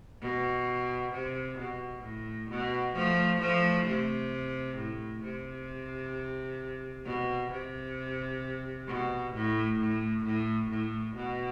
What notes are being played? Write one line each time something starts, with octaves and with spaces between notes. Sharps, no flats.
B2
C3
B2
A2
B2
F3 A3
F3 A3
C3
A2
C3
B2
C3
B2
A2
A2
A2
A2
B2